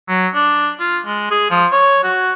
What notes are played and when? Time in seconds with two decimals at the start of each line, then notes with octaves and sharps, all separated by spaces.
0.08 F#3
0.34 D4
0.80 F4
1.06 G#3
1.31 G#4
1.51 F3
1.72 C#5
2.04 F#4